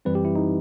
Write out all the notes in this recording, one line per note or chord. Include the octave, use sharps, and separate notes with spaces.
F#2 E3 G3 C4 B4
G4
E4
D#4